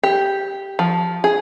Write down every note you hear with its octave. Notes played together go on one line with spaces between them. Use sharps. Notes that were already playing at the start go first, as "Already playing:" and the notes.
G4
F3
G#4